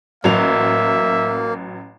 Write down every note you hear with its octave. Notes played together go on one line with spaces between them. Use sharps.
A1 F#3 A#3 E5 F7